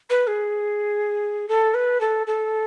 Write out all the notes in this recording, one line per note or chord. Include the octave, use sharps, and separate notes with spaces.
B4
G#4
A4
B4
A4
A4